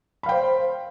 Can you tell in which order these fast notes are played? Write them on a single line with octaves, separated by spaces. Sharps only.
B5 F5 G5 C5